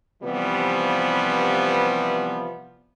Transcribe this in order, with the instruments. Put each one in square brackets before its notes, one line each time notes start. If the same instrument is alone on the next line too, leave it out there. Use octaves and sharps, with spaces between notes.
[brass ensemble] C3 E3 F3 G3 B3